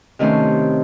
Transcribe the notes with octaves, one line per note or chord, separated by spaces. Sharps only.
C3 D#3 A3 C#4 C5